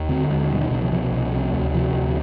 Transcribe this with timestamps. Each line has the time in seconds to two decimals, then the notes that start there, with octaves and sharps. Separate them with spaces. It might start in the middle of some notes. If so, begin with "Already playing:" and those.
Already playing: D#2
0.09 D3 C4
0.30 D#2 G#3
0.50 B2 G3
0.61 D#3
0.71 C2 D3
0.81 F3
0.92 B2 F3
1.12 C2
1.33 C3
1.53 D2
1.74 C3 F3
1.94 D2